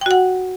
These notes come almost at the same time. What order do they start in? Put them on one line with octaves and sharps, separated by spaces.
G5 F#4 F#5